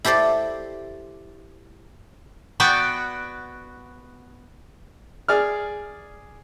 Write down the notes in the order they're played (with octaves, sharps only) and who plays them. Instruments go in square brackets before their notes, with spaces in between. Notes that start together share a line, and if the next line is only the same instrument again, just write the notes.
[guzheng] E4 G4 A4 C5 D5
[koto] B3 F#4 D5 G5
[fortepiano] G#4 D5 F6